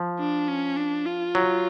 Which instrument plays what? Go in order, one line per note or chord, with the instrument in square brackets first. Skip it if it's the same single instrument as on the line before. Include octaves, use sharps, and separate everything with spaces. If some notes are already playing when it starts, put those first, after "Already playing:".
Already playing: [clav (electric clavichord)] F3
[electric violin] D4
C#4
D4
F4
[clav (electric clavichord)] F#3